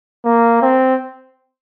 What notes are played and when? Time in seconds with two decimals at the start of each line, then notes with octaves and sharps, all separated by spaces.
0.25 A#3
0.62 C4